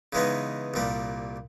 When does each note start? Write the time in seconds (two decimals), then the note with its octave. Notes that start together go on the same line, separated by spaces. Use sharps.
0.13 C#3 E3 G#3 B3 D#4
0.74 C2 A#2 G3 A#3